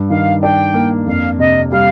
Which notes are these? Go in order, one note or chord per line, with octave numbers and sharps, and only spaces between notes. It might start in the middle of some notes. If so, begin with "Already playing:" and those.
Already playing: G2
D#3 F5
D4 G5
A#3
F2 F5
C3 D#5
G3 F5